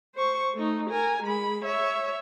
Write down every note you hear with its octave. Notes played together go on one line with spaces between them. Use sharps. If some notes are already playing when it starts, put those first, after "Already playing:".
C5 C#6
A3 D#4
A#4 G#5
G#3 B5
C#5 E5